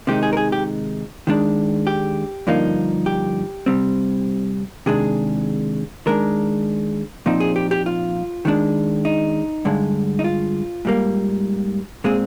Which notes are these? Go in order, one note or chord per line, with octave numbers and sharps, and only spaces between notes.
C3 D#3 G#3 D#4 G4
G#4
A#4
G#4
G4
D#3 G#3 D4
G4
G2 D3 F3 A#3 D#4
G4
C3 G3 C4
C3 D#3 G#3 D4 G#4
D#3 G#3 D4 A#4
A#2 F3 C4 D#4
G#4
G4
G4
F4
D#3 G#3 D4
D#4
G2 D3 G#3
D#4
F4
G#2 G3 A#3
A#2 G#3 C4 G#4